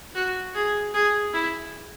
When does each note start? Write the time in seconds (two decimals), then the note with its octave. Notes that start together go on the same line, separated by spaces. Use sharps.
0.15 F#4
0.54 G#4
0.94 G#4
1.33 E4